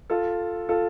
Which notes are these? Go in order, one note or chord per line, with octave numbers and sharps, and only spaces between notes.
F4 A4
F4 A4